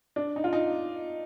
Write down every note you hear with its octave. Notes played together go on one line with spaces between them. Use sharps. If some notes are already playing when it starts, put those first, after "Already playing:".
D4
D#4
F4
D#4